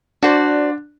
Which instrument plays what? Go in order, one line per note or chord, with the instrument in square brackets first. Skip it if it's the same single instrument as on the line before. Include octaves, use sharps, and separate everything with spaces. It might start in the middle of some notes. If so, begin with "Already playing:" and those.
[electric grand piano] D4 [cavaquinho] F#4 C5 D5